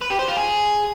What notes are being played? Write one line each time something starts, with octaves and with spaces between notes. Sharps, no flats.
B4
G4
C5
F4
G#4